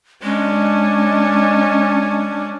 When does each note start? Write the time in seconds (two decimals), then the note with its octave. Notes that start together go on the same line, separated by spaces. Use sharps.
0.23 G#3 C#4 D4